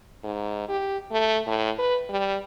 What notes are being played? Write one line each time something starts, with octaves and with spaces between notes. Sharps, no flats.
G#2
G4
A3
A2
B4
G3